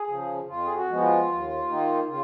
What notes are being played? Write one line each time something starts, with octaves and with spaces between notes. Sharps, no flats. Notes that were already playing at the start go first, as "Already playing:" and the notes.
Already playing: G#4
C#3 F3
F2 F4
G#4
F#4
F3 G#3 B3
F4
D#2
D#3 A#3 D#4
C#3 F4